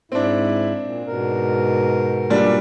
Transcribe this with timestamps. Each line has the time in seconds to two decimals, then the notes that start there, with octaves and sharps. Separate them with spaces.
0.12 G#2 C4 D4 E4
0.82 A#2
1.07 G#2 B2 A#4
2.30 A#2 G3 D4